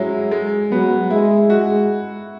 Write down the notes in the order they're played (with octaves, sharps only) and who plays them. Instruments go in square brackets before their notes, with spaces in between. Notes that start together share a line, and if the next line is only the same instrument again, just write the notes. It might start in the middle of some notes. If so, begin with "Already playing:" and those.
Already playing: [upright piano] F#3 G#3 C#4 E4
G#3
[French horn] F#3 [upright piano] B3
[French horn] G#3 [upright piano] E4
[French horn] G#3 [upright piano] F#4